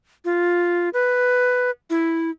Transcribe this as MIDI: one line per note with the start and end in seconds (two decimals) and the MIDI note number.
0.25 0.89 65
0.93 1.71 71
1.90 2.30 64